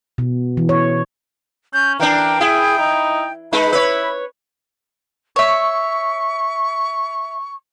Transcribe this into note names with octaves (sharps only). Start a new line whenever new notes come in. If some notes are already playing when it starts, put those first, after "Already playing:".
B2
E3
C#5
C#4 G6
E3 D4 A#4 G5
E4 G#4
D#4
G#3 D#4 B4 B5
E4 B4 C#5
C#5 E5 C#6